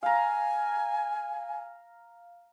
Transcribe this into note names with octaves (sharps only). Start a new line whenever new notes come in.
F5 G#5 A#5